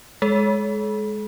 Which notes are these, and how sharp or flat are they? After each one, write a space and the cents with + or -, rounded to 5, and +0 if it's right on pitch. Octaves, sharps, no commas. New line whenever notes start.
G#3 +0 A4 -45